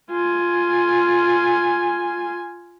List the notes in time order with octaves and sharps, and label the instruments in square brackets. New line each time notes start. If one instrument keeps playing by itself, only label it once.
[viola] F4 G#5